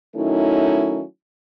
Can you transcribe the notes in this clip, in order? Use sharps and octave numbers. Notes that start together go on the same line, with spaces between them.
D#3 F#3 A3 C#4 D#4 E4